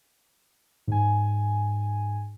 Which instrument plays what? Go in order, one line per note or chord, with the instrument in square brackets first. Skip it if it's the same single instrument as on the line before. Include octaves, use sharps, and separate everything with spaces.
[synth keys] G#2 G#5